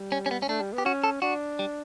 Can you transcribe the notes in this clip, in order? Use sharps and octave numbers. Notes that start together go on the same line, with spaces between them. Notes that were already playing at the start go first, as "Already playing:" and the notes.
Already playing: G3
C#4
C#4
B3
C#4
A3 D4
G3
B3
G4
C#4 F#4
A4
D4 F#4
G3